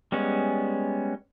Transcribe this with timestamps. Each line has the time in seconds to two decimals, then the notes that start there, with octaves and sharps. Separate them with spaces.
0.12 G3 G#3 B3 C#4